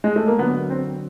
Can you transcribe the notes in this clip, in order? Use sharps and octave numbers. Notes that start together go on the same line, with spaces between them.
G#3
A3
A#3
D3 F#3 B3
C4